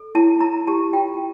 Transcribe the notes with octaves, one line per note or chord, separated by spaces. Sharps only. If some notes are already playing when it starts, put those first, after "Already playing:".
Already playing: A4
E4 A5
E4 A#5
G4 A5
F4 G5